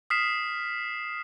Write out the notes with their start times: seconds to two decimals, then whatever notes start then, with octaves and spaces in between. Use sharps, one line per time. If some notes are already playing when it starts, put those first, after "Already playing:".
0.10 D#6 F6 B6 C7 E7